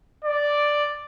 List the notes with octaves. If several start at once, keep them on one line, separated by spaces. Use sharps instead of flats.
D5